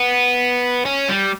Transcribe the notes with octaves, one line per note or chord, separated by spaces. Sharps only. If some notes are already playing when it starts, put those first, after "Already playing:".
Already playing: B3
C#4
G3